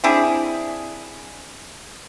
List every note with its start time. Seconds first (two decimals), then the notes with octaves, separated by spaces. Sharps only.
0.04 C4 D4 E4 G#4